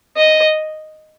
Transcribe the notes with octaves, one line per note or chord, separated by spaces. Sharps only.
D#5